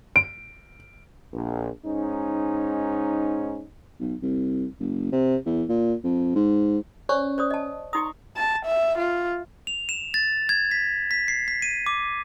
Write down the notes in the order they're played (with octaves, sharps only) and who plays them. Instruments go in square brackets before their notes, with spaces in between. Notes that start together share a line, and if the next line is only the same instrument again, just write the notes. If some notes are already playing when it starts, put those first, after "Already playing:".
[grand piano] D7
[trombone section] A#1
G#2 C#4 D#4
[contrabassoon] B1
C2
F#1
C3
E2
A#2
F2
G#2
[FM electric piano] C#4 [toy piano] C5 D5 C#6
[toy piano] C5 D5 D#6
D#5 A5
[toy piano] D#4 D#6 [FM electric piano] A#5 C6 C#6
[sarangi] A5
E5
F4
[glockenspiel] F7
E7
A6
G#6
B6
B6
C7
B6
D#7
D6